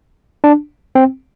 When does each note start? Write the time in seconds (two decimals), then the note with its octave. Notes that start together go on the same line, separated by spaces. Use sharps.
0.44 D4
0.95 C4